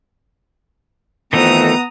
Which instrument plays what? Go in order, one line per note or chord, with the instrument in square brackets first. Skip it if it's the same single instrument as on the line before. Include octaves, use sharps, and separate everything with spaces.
[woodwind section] F2 [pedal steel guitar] D#3 E3 A3 [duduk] B3 [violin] A#5 D#6